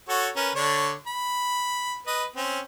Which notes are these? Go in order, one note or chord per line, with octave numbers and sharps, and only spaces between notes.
F#4 A4 C#5
C#4 A#4 B4
D3 D4 C#5
B5
B4 D#5
C4 C#4